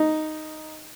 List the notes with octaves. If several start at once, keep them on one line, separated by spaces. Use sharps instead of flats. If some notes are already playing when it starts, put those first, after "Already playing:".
Already playing: D#4